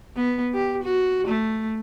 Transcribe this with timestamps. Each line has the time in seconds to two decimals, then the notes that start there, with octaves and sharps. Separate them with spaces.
0.16 B3
0.54 G4
0.84 F#4
1.28 A3